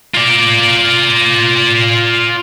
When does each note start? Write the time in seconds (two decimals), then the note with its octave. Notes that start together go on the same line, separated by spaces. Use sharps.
0.15 F4 D5